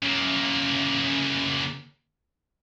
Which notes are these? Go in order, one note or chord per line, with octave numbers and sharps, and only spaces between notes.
C#3 A#3